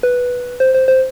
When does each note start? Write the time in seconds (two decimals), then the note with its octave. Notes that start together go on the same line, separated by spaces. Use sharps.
0.03 B4
0.60 C5
0.74 C5
0.88 C5